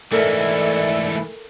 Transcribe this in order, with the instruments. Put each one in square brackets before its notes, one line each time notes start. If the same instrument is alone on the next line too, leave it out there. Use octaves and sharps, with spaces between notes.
[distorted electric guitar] G#2 A3 [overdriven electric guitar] E3 [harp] A4 A#4 F6 [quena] D5